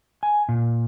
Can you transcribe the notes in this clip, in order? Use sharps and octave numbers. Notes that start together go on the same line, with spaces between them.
G#5
A#2